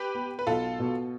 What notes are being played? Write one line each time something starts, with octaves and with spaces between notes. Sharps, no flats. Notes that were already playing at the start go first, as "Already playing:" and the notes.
Already playing: G4 B4
B3
B4
B1 F4 A4
B2